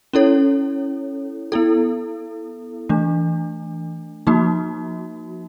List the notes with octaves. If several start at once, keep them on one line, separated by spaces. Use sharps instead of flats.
C#4 E4 A4 C#5
B3 E4 A4
E3 A3 D4
F3 A#3 D#4 F#4